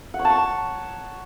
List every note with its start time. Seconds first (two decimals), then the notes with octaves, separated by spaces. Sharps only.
0.14 F#5
0.19 C#5
0.25 A5
0.30 C#6
0.36 A5